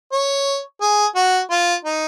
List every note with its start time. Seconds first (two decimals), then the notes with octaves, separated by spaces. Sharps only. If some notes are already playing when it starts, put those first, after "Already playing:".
0.12 C#5
0.81 G#4
1.16 F#4
1.50 F4
1.85 D#4